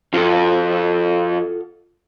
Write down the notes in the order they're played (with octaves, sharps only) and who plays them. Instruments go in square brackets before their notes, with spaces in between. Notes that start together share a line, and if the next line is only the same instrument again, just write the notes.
[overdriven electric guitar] F2 [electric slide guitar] F4 F#4 A4